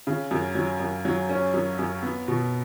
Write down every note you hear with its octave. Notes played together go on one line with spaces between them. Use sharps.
C#3
F#2
F#3
F#2
F#3
C#4
F#2
F#2
B3
B2